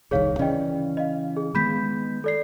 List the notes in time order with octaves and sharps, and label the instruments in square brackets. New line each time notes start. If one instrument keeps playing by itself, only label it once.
[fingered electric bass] D#1 C2 D#3 [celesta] G#4 C#5 F5
[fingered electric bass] C#3 E3 C#4 [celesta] D5 D#5 G5
[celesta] D#5 F5
G#4
[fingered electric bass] D#3 G#3 B3 [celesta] B5 G6 B6
[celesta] A4 D5 C7